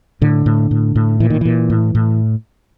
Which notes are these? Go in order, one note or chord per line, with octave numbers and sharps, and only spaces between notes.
A2 D3
A2
A2
A2
A#2 E3
D#3
A#2 E3
A2
A2